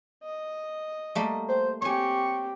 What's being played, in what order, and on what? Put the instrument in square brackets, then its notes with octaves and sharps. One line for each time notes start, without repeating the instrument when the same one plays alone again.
[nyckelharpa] D#5
[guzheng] G3 A3 A#3
[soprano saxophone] C5
[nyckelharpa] C4 G4 [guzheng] C#5 G#5 [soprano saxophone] C#6